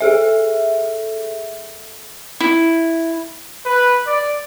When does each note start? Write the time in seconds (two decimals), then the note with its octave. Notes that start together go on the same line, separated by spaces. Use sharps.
0.01 G#4 A4 E5
2.40 E4
3.66 B4
4.07 D5